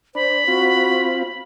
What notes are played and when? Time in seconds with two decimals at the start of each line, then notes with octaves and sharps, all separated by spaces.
0.15 D4 C5 B5
0.48 C4 F4 F#4